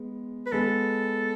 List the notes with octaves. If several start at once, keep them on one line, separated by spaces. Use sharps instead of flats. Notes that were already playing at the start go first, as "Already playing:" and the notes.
Already playing: G#3 B3
B4
G#3 B3 A4